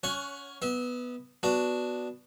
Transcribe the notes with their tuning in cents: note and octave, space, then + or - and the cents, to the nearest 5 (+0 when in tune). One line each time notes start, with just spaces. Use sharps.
C#4 +20 C#5 +0 F#5 +0
B3 +0 E5 -30
B3 +0 D4 -5 F#4 +0